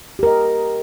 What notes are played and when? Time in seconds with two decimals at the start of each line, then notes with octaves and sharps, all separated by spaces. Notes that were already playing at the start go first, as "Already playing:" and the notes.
0.19 G4
0.23 A#4
0.27 D#5